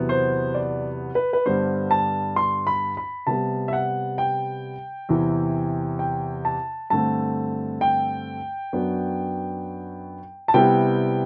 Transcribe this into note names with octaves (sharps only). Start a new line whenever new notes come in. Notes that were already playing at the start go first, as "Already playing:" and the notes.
Already playing: E2 C3 F#3 B3
C5
D5
B4
B4
G2 D3 G3 B3 D4 C5
A5
C6
B5
B5
C3 G3 B3 A5
E5
F#5
G5
E2 C3 E3
G5
A5
G2 D3 A3 C4 A5
G5
F#2 F#3 B3 D4
A5
C3 G3 B3 E4 G5